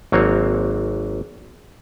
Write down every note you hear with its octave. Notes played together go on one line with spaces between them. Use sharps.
G#1 F#3 A#3 C4 C#5